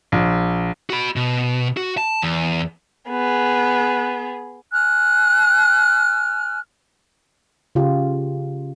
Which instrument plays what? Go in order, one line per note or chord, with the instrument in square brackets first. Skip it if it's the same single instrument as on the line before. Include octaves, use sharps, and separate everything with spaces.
[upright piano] A#1
[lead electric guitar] F#4 B5
B2
F#4
A5
E2
[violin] B3 G#4
[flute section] G#5 F6 F#6
[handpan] C#3 F4 G4